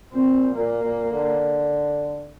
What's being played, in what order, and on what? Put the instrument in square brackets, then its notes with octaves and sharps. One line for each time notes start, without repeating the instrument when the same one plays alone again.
[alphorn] A#2 [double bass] C4
[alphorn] A#2 [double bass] A#3
[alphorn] A#2
D3